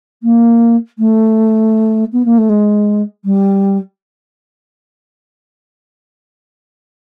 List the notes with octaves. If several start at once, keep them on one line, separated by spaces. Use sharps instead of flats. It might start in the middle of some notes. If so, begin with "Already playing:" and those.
A#3
A3
B3
A#3
A3
G#3
G3